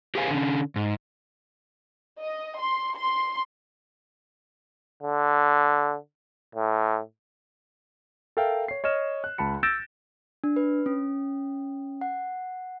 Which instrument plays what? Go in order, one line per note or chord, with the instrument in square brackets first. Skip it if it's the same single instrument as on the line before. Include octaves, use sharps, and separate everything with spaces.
[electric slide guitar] G4 G#4 A#4 C5 F5 G#5
D3 C#4
G#2
[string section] D#5
C6
C6
[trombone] D3
A2
[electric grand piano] A4 A#4 E5 F5 G5
C#5 C7
C#5 D#5 F6 E7
F#6
C#2 A5 B5 C#7
E6 G6 A6 A#6 D7 E7
[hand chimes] D4
B4
C#4
F#5